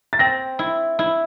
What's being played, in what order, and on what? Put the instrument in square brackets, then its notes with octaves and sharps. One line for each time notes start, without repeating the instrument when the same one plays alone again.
[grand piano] A6
[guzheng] C4 [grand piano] A#6
[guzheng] E4
E4